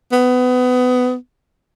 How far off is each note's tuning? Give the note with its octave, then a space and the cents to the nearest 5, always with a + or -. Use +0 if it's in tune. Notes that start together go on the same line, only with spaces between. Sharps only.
B3 +25